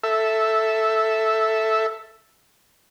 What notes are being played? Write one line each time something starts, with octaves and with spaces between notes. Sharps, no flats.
A4 E5